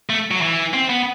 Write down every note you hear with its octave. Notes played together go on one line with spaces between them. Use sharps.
A3
F#3
E3
C4
B3